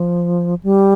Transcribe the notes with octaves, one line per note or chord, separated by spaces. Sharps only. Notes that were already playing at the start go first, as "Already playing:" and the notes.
Already playing: F3
G3